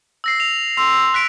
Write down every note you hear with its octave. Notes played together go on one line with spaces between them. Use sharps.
E6 A#6 C7
F7
C6 E6 F7
F#6 B6 D7